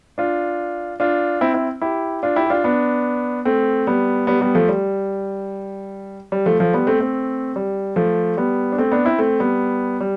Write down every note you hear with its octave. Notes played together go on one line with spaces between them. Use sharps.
D4 F4
D4 F4
C4 E4
C4 E4
E4 G4
D4 F4
E4 G4
G4
D4 F4
B3 D4
A3 C4
G3 B3
G3 B3
G3 B3
F3 A3
G3
G3
F3 A3
F3 A3
G3 B3
A3 C4
A3 C4
G3
F3 A3
G3 B3
D4
A3 C4
B3 D4
C4 E4
A3 C4
G3 B3
G3